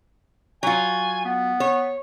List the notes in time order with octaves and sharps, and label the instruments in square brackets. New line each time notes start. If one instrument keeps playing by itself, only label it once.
[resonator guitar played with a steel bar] F#3 F4 [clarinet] G#5
[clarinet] B3
[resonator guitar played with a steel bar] C#5